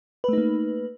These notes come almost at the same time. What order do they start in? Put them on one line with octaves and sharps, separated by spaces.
B4 A3 D#4 A#3